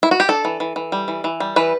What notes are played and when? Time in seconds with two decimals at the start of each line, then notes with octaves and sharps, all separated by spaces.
0.03 E4
0.11 F#4
0.20 G4
0.29 D4 A4
0.45 E3
0.60 E3
0.76 E3
0.92 G3
1.08 E3
1.24 E3
1.40 G3
1.56 E3 B4